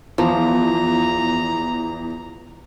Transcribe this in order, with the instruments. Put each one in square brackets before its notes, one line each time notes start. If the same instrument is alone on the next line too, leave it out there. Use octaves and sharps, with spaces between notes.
[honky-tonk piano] E2 [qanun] F3 [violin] A#5